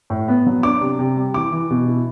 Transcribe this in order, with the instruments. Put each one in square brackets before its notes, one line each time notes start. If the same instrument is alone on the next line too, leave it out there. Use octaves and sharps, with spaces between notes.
[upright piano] A2
B3
F#3
D4 D6
C3
C3
G3
E3 D6
E3
B2
E4